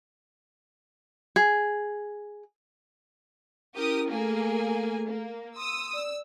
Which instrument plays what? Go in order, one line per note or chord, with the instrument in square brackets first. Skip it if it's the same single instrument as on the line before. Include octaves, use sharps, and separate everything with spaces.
[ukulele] G#4
[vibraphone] C#4 E4 [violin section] G4 A#4 D#6
[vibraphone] A3 A4 [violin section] A#3 G#4 G#5
[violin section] A#3
[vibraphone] C6 [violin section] D#6 E6
[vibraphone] D5 [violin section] E6